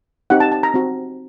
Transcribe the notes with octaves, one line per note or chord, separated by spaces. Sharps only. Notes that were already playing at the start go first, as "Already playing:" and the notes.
C4 D#4 G4 F#5
A5
A5
A#5
C4 F#4